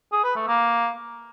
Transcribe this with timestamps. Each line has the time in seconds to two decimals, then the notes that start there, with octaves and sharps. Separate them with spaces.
0.12 G#4
0.24 B4
0.36 A3
0.47 A#3